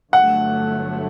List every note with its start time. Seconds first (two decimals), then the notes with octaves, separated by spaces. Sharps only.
0.13 G1 G2 D3 F#3 A3 F#5